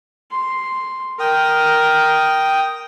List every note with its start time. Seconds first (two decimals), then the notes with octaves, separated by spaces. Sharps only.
0.32 C6
1.20 A#4 G5 D#6